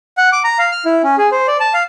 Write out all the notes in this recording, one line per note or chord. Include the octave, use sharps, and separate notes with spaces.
F#5
D6
A#5
F5
F6
E4
C#4
G#4
C5
D5
A5
F5